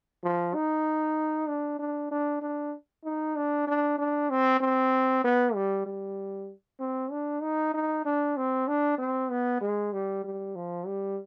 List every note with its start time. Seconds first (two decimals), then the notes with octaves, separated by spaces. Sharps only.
0.24 F3
0.55 D#4
1.48 D4
1.79 D4
2.11 D4
2.41 D4
3.05 D#4
3.36 D4
3.67 D4
3.99 D4
4.30 C4
4.60 C4
5.24 B3
5.54 G3
5.86 G3
6.80 C4
7.11 D4
7.42 D#4
7.74 D#4
8.05 D4
8.37 C4
8.68 D4
8.98 C4
9.31 B3
9.61 G#3
9.93 G3
10.24 G3
10.55 F3
10.87 G3